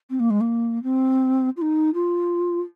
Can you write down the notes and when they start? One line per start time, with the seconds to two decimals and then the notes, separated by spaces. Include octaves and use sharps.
0.10 C4
0.20 A#3
0.30 G#3
0.41 A#3
0.83 C4
1.57 F4
1.62 D#4
1.94 F4